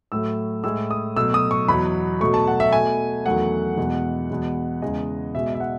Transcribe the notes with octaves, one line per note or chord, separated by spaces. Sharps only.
A2 F#3 A3 E6
A2 G#3 E6
D#6
B2 F#3 A3 E6
D#6
C#6
E2 B2 F#3 B5
B2 F#3 A3 C#6
A5
F#5
E5
B2 A3 G#5
E2 D#3 F#3 A3 F#5
E2 B2 G#3
E2 B2 G#3
E2 C#3 G#3 D#5
B2 G#3 E5
E5
F#5